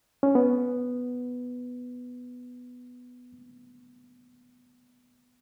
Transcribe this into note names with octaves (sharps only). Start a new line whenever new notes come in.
C#4
B3